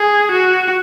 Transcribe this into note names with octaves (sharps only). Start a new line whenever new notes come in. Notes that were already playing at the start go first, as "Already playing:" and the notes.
Already playing: G#4
F#4